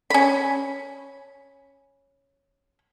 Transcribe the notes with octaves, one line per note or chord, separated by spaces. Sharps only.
C#4 B5